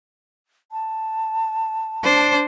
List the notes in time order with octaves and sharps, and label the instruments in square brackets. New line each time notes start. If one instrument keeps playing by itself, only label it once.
[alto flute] A5
[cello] D4 C5